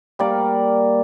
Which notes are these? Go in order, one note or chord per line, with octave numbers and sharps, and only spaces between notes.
G3 A#3 A#4 D5